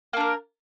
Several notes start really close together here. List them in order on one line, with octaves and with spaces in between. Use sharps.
A#3 D4 A#4